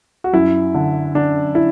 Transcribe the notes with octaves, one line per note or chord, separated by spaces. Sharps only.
F#4
F#2 E4
D3
D3 D4
E4